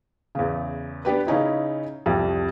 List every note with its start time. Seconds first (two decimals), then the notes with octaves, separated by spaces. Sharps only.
0.35 E2 C#3
1.05 B3 D4 G4 B4
1.27 C#3 C#4 D#4 E4
2.06 C2 F2 G3